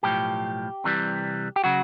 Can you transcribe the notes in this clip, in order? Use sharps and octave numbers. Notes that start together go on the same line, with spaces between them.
B1 A2 F3 G4
C2 C3 E3 G3
G4
C#3 F#3 F#4